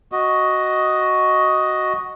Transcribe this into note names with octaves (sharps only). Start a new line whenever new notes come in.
F#4 D#5